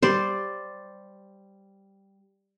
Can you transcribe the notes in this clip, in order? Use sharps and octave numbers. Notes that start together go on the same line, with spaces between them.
G3 C5 D5